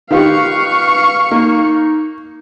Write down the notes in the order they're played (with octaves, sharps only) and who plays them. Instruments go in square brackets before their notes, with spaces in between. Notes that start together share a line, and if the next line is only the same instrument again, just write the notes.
[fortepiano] D#3 F4 G4 [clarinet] B4 [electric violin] F5 C#6
[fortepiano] A#3 [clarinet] D#4